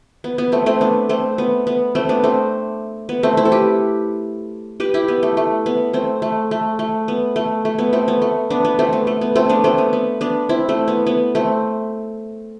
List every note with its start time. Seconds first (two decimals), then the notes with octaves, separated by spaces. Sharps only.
0.24 B3
0.38 B3
0.52 A3 C4
0.66 A3 C4
0.81 B3 D4
1.09 A3 C4
1.38 B3
1.67 B3
1.95 A3 C4
2.09 B3 D4
2.24 A3 C4
3.09 B3
3.23 A3 C4
3.37 C4 E4
3.45 A4
3.52 G4 B4
4.80 G4 B4
4.94 E4 G4
5.08 B3
5.23 A3
5.37 A3
5.66 B3
5.93 A3 C4
6.22 A3
6.51 A3
6.79 A3
7.08 B3
7.36 A3
7.65 A3
7.79 B3
7.93 A3 C4
8.08 B3
8.22 A3
8.50 B3 D4
8.65 B3
8.79 A3 C4
8.93 B3
9.07 A3
9.21 B3
9.36 A3 C4
9.49 B3 D4
9.64 A3 C4
9.78 B3
9.93 B3
10.21 B3 D4
10.49 C4 E4
10.69 A3 C4
10.88 B3
11.07 B3
11.35 A3 C4